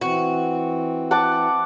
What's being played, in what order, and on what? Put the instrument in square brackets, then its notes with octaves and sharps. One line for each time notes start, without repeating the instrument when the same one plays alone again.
[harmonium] E3 C4 [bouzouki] F#4
[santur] F#5 A5 D6